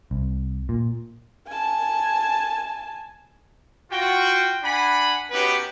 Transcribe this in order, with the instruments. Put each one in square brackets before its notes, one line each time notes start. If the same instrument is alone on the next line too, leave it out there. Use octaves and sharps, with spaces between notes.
[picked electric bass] C2
A#2
[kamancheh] G#5 A5
[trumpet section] F4 F#4 G5
D4 F#5 G#5 B5
B3 C#4 D#4 F#4 G4 B4